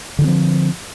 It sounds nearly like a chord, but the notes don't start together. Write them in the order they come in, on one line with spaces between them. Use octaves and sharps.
D3 D#3 C4 F3